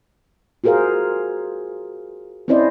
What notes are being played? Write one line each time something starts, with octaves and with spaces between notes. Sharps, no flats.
F4 F#4 G#4 A#4 C5 F5
C4 C#4 E4 C5 D5 D#5